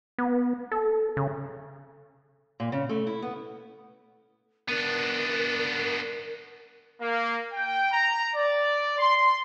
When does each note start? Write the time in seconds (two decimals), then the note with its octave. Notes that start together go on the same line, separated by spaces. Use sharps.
0.18 B3
0.72 A4
1.17 C#3
2.60 A#2
2.72 C#3
2.89 A3
3.07 E4
3.22 B3
4.68 B3 D4 A#4
7.01 A#3
7.52 G5
7.91 A#5
8.34 D5
8.99 C6